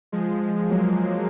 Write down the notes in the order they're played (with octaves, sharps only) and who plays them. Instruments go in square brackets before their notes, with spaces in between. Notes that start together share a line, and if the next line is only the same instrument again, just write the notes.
[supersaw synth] F3 G#3
F#3 A#3